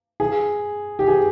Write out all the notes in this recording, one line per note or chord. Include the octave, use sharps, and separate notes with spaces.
G#4
G4
G#4